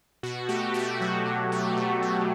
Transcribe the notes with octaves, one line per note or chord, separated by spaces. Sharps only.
B2 F#4
A3 G4
B2 F#4
F#3
B2
A3
B2
F#3